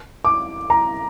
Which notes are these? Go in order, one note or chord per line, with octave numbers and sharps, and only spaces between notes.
D6
A#5